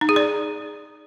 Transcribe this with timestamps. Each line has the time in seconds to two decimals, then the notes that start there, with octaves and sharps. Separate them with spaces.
0.01 D#4
0.09 G#4
0.16 D5